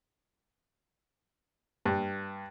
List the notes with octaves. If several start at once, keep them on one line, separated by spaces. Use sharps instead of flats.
G2